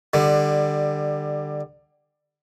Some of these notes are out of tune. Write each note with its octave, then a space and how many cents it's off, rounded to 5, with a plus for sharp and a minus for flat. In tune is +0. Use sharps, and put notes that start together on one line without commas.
D3 +25 G3 +10